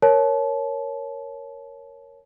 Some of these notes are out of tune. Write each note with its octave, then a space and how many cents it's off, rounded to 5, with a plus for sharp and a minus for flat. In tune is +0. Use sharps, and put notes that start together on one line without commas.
A#4 +0 C#5 -5 A5 -30